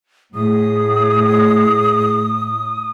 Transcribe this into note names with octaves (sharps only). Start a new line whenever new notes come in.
A2 G#4 D#6